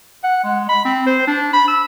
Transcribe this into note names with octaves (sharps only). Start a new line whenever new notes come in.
F#5
G#3
B5
C4
C5
D4
B5
E6